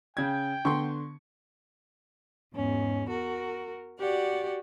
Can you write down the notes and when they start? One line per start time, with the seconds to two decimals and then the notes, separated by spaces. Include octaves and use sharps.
0.17 C#3 G5 G#6
0.65 D3 B3 C6 C#6
2.53 E2 G#2 C#4
3.08 F#4 A#4
3.99 F#4 G4 D5 F#5